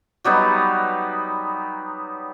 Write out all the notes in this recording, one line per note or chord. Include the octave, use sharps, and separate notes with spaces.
F#3 G3 B3 D#4